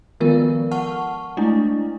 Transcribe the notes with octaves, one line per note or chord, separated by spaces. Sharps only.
D#3 F3 G#3 B3 F4 A#4
F#5 A5 C#6 F6
G#3 A3 D4 E4